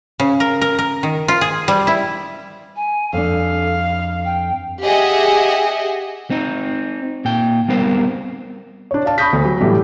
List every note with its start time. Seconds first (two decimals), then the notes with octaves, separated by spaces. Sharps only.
0.20 C#3
0.40 A#4
0.61 A#4
0.79 A#4
1.03 D#3
1.28 F4
1.41 G#4
1.68 G3
1.87 E4
2.76 G#5
3.13 F2 D4 A4 F5
4.25 G5
4.82 G4 G#4 D#5 E5 F#5 G#5
6.30 C4 D#4
7.25 A#2 G5
7.68 G3 B3 C4 A#4 C5
8.91 D4 C#5
9.05 D5 F5 A5
9.18 B5 C#6 D#6 G6 A#6 B6
9.33 D2
9.45 F#3
9.60 A2 E3 F#3 G3